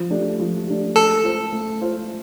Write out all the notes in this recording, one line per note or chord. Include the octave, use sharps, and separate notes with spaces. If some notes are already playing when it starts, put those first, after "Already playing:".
Already playing: F3
A3 D4 G4
F3
A3 D4 G4
A3 A4
F4 C5
A3
F4 C5